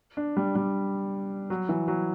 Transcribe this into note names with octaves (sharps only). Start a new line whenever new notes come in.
D4
G3
G3
F#3
E3
F#3